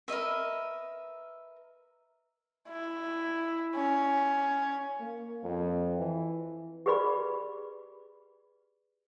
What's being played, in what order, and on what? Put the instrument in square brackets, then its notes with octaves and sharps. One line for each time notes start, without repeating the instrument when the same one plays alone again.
[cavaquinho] A#4 B4 D#5 E5
[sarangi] E4
C#4
[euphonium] A#3
F2
E3
[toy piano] G4 G#4 B4 D5 B5